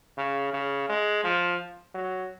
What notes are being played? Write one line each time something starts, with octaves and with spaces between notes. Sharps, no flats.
C#3
C#3
G#3
F3
F#3